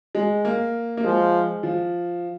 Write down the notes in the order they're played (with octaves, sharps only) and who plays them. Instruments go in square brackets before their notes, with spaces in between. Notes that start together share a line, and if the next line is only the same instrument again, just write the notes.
[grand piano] G#3
A#3
A#3
[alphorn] F3 [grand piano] G#3
[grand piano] F3